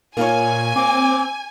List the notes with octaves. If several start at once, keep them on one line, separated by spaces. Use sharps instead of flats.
A#2 A#3 F4 C#5 G#5
C4 D6